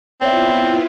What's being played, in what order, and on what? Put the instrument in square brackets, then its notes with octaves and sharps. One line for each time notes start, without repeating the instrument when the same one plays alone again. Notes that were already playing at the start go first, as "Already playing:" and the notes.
[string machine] B3 E4 F4 [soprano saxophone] C4 [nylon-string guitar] C#5 D5 E5